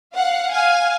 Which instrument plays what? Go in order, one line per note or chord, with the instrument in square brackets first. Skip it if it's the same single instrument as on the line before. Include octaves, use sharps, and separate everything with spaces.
[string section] F5 F#5
[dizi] F5 [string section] G#5